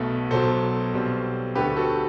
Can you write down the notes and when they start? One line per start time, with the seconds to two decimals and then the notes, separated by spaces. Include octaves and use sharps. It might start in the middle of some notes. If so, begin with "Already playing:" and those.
Already playing: B1 B2 A3
0.31 B1 B2 F#3 A4 C5
0.94 B1 B2 G3 C4
1.55 D2 D3 A3 C4 G4 B4
1.76 F#4 A4